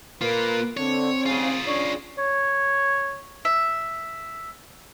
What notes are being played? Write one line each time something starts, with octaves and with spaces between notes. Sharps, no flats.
A#3 F4 A#4 B4
D3 C4 C#5
C2 G#2 C#3 F4 G#4
C#4 D4 C#5
C#5
E5